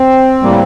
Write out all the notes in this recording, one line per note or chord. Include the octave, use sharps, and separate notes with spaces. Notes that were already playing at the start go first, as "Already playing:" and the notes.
Already playing: C4
A2 G3 A#3